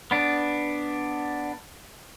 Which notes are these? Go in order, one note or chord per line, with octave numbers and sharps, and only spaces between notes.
B3 D4